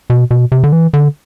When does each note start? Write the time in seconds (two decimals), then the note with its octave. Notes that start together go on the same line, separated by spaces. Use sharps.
0.10 B2
0.31 B2
0.52 C3
0.64 D3
0.72 E3
0.93 D3